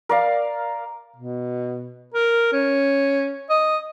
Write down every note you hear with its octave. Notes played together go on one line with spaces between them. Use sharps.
A#4 D5 F5
B2
A#4
C#4
D#5